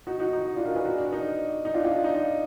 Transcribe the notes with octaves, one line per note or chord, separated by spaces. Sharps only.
D#4 F#4
D#4 F#4
D#4
D#4
D4 F4
F#4 A#4
G#4 B4
F#4 A#4
D4
D#4
D#4
D4 F4
D4 F4
D#4